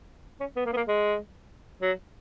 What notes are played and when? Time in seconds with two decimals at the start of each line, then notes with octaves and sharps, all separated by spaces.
0.40 C#4
0.56 B3
0.66 A#3
0.73 B3
0.77 A#3
0.87 G#3
1.82 F#3